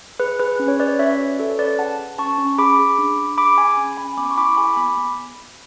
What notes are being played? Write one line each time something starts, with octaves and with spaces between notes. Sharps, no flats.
G#4 B4
G#4 B4
C#4
C#5
C#4 B4 D5
C#4 C#5 E5
C#5
F#4 B4 D5
A4 C#5
C#4 B4 D5
G#4 F#5 A5
G#4
C#4 A5 C#6
C#4
G#4 B5 D6
G#4
D4
D4
G#4 B5 D6
G#4 G#5 B5
C#4
C#4 G#5 B5
B3 B5 D6
C#6
E4 B5 D6
G#4 G#5 B5
B3 B5 D6
B3